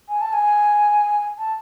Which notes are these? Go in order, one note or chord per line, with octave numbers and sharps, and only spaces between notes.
G#5
A5
G#5
A5